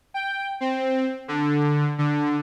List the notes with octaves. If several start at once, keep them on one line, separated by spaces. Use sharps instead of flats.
G5
C4
D3
D3